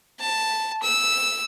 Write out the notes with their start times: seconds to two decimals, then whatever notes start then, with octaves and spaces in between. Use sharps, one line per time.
0.20 A5
0.82 E6